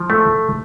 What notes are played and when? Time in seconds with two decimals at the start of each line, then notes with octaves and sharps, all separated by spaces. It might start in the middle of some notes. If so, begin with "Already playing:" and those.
Already playing: F3
0.10 A3